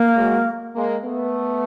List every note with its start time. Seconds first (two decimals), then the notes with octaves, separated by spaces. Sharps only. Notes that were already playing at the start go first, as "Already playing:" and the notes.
Already playing: A#3
0.17 F#3 G#3
0.75 G#3 A#3
1.03 A3 B3